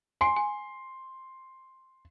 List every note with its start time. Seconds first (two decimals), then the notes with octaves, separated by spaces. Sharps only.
0.21 G#5 C6 C7 D7
0.36 G#5